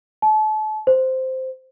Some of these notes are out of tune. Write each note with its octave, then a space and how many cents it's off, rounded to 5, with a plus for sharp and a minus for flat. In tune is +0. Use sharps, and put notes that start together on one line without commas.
A5 -35
C5 -5